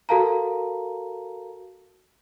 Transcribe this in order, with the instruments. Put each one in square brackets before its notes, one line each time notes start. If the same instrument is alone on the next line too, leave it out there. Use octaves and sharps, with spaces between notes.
[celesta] F#4 A4 A#4 F5 A5 A#5